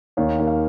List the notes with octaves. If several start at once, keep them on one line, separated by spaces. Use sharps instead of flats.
D#2 C#5
D#2
F5